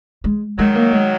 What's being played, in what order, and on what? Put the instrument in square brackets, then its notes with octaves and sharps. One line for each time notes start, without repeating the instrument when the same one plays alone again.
[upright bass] G#3
[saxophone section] D#3 F#3 [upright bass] G#3
[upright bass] A#3
G#3